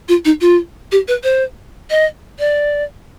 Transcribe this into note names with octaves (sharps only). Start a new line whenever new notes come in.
F4
D#4
F4
G4
B4
C5
D#5
D5